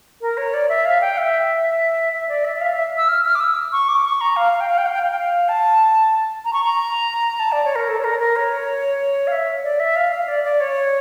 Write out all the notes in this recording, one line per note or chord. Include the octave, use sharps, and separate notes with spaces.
A#4
C#5
D5
E5
F5
G5
E5
E5
D5
E5
E5
F5
E5
E6
F6
F6
D6
E6
C#6
D6
C#6
A#5
F5
F5
G5
F5
G5
F5
G5
F5
G5
F5
A5
A#5
C#6
A#5
A5
D5
C#5
A#4
A4
C#5
A#4
A#4
C#5
F5
E5
D5
E5
F5
F5
D5
D5
C#5